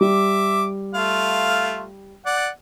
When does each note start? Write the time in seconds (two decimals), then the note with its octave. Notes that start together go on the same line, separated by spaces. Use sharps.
0.01 G3 E5 D6
0.94 A3 F4 F5
2.26 D5 F#5